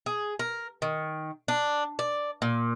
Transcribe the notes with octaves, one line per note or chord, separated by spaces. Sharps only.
G#4
A#4
D#3
D4
D5
A#2